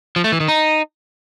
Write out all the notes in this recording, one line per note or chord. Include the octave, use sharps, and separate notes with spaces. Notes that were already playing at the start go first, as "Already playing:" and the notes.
F3
A3
E3
D#3
D#4